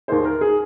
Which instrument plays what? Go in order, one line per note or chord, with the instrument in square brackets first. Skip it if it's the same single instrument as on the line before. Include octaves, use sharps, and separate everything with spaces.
[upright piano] D#2 D#3 A#3 D#4 G#4 C5
A#4
G#4